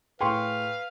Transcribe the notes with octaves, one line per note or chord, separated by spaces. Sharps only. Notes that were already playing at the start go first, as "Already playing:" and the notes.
A2 G#4 B4 F5 G5 C6 C#6